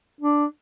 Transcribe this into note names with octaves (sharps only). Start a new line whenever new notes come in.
D4